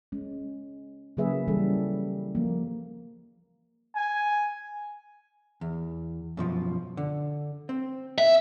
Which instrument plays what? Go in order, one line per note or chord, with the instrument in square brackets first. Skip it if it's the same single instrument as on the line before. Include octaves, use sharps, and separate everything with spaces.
[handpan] G#3 C#4
C#3 F#3 A#3 G#4 B4 E5
E3 G3 C#4 G4 A4
F3 A#3
[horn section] G#5
[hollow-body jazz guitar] E2
F#2 B2 F3
D3
C4
[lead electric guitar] E5